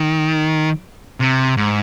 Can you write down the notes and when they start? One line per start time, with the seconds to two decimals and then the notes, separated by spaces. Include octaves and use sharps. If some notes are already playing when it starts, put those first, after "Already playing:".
Already playing: D#3
1.20 C3
1.57 G#2